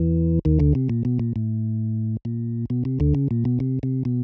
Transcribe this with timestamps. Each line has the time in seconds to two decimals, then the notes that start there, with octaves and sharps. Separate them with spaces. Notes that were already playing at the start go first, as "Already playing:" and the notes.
Already playing: E2 E3
0.45 D#2 D#3
0.60 D2 D3
0.75 C3
0.90 A#2
1.05 B2
1.20 A#2
1.36 A2
2.25 A#2
2.70 B2
2.85 C3
3.00 D2 D3
3.15 C#3
3.31 A#2
3.45 B2
3.60 C3
3.83 C3
4.05 B2